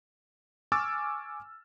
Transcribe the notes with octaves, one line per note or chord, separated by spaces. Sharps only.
G#5 C#6 D6 E6 F6 A6